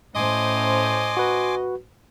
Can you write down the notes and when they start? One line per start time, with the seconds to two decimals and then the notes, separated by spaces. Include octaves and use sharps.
0.15 A2 C#4 C5 D#5 G#5 C6 D6
1.17 F#4 B4